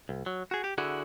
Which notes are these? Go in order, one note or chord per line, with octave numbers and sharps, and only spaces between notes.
C2
F#3
F#4 G#4
G4
D3 E4 F#4 G#4